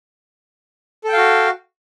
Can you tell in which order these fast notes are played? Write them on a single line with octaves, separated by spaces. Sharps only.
A4 G5 F5 F#4